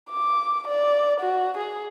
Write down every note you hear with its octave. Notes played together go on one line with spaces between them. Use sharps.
D6
D5
F#4
G#4